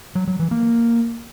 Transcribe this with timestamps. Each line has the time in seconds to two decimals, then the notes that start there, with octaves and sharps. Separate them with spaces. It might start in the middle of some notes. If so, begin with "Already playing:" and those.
0.15 F#3
0.27 F#3
0.39 E3
0.51 A#3